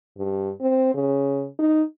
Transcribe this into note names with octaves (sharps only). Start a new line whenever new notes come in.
G2
C4
C#3
D#4